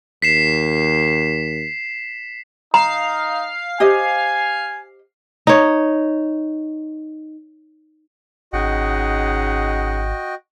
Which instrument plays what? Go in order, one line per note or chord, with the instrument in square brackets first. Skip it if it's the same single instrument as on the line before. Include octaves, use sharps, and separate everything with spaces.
[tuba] D#2 [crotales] B6 C7 E7
[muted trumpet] D#4 [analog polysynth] F5 C7 [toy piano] A#5
[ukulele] G4 C5 D#5 [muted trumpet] G#5
[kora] D#4 C#5
[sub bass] G#1 [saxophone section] C#3 D#4 F#5 [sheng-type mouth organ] F#4 D#5 G5